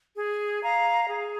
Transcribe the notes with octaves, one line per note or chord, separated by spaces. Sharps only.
G#4
F5 A#5
G#4